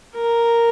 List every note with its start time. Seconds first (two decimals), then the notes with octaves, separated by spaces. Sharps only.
0.15 A#4